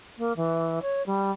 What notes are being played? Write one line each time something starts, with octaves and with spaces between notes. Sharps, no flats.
A#3
E3
C#5
G3